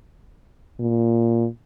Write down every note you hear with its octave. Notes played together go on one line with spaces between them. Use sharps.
A#2